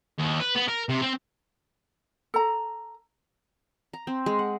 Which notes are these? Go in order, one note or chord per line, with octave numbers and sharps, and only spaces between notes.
D#2
B4
B3
A#4
C3
C4
A4 A#5
A#5
C4
G#3
F#5